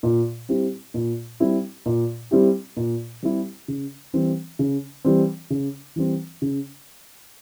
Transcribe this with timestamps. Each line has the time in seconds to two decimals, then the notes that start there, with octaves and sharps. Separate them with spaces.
0.03 A#2
0.49 G3 C4 E4 G4
0.94 A#2
1.40 G3 C4 E4 G4
1.86 A#2
2.31 G3 C4 E4 G4
2.77 A#2
3.23 G3 C4 E4 G4
3.68 C#3
4.13 E3 G3 C4
4.59 C#3
5.04 E3 G3 C4
5.50 C#3
5.96 E3 G3 C4
6.42 C#3